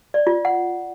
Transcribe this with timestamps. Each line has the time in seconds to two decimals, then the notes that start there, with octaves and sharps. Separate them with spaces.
0.14 D5
0.27 F4
0.45 F#5